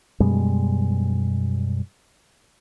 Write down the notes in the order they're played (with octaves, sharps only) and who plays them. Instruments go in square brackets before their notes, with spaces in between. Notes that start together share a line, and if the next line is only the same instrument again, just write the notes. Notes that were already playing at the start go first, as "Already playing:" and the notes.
[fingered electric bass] F#2 B2 G3 G#3